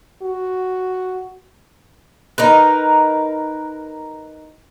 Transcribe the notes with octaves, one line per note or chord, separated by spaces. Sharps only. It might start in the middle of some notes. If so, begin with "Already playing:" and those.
F#4
D#4 A#4 B4